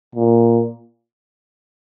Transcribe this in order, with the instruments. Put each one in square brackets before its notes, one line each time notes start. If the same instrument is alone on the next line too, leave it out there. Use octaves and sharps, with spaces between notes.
[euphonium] A#2